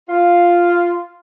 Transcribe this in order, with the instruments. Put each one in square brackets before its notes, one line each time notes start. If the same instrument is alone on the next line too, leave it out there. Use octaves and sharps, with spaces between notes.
[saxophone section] F4